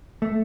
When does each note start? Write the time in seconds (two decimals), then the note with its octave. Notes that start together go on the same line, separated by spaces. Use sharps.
0.22 A3